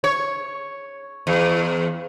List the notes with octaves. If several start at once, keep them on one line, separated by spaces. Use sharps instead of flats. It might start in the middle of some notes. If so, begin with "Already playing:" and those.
C#5
E2